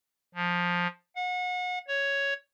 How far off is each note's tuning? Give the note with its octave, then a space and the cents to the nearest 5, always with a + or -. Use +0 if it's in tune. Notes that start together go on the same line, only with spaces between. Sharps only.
F3 +10
F#5 -35
C#5 +5